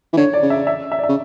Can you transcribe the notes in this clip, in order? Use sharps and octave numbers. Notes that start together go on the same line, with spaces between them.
E3
D3 C#5
D5
C#3
E5
E5
E5
D5
E5
C#3